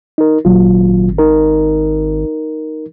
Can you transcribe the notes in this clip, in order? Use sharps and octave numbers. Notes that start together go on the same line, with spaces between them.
D#4 A#4
G#1 A#2 F#3 F4
D#4 A#4